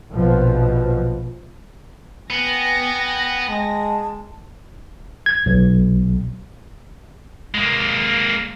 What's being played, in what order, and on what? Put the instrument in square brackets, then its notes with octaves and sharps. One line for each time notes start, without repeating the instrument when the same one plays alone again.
[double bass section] A#1 B2 F3
[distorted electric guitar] B3 [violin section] G5 G#5 A#6
[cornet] G#3 [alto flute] A5
[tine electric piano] G#6
B1
[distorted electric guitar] G#3 A#3